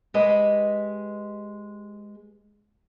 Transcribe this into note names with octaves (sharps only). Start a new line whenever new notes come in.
G#3 G4 B4 D#5